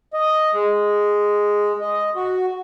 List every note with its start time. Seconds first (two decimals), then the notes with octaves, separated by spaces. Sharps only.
0.14 D#5
0.53 G#3
1.81 D#5
2.15 F#4